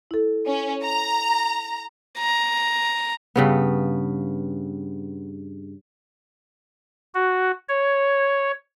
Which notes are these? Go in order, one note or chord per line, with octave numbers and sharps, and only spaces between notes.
E4 A4
C#4
A#5
A#5
G2 C#3 B3
F#4
C#5